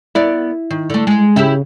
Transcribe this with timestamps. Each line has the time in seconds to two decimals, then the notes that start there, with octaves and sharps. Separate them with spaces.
0.15 B3 E4 A#4 D5
0.70 D#3
0.90 D3 A3
1.07 G#3
1.36 C#3 E4 G4 E5